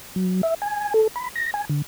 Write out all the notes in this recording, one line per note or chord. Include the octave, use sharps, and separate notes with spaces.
F#3
E5
G#5
A4
B5
A#6
G#5
D3